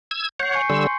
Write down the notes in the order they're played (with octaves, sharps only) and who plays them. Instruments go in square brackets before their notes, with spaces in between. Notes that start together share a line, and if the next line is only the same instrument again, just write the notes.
[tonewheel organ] E6 G#6
[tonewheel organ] C#5 F#5 [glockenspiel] G6 C7
[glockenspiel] G#5 C#6 C#7
[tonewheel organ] D3 G3 E6 [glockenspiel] C6